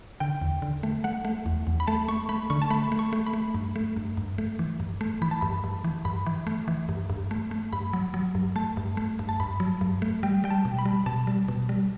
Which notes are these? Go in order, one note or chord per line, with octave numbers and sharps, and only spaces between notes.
D3 G5
E2
D3
A3
A3 F#5
A3
E2
E2
B5
A3 A5
A3 C#6
A3 B5
D3 C#6
A5
A3 B5
A3
C#6
A3
B5
A3
G2
A3
G2
G2
A3
E3
G2
A3
E3 B5
A5
G2 B5
G2
E3
G2 B5
E3
A3
E3
G2
G2
A3
A3
G2 B5
F#3
F#3
G2
A3 A5
G2
A3
G2
A5
G2 B5
F#3
G2
A3
G3 G5
G3 G5
A5
B2
B5
G3
B2 A5
G3
B2
G3